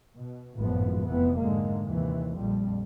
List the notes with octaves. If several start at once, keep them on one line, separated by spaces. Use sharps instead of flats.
B2
G#1 F#2 A2 F3 B3
F1 F2 C3 E3 B3
G#2 D3 G#3 A#3
D#2 C3 E3
A#1 F2 G3